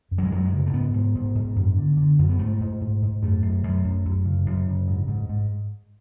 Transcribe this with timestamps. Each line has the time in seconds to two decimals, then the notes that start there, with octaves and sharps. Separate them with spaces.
0.11 F#2
0.18 F#3
0.25 G#3
0.31 F#2 F#3
0.45 G#3
0.53 C#3
0.66 A3
0.73 G#2 B3
0.94 G#2
1.15 G#2
1.35 G#2
1.56 F#2
1.77 D3
1.97 D3
2.19 F#2
2.29 B3
2.39 G#2 A3
2.60 G#2
2.81 G#2
3.02 G#2
3.22 F#2 A3
3.42 F#2
3.63 F#2
3.84 F#2
4.05 F#2
4.26 C#3
4.46 F#2
4.68 C#3
4.88 G#2
5.08 G#2
5.30 G#2